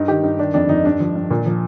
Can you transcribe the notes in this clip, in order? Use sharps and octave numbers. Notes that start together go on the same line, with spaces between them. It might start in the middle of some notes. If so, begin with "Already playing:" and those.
Already playing: G2 D#4
D#3 G4
G2 D#4
D#3 D4
F2 D4
F2 D#4
G2 D4
F3
G2
A#2
F3